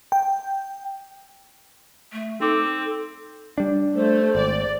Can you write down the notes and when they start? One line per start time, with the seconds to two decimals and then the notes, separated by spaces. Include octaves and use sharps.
0.12 G5
2.12 A3
2.41 C4 D#4 A4 D6
3.58 G3 D4
3.96 A3 C5
4.35 G#1 D5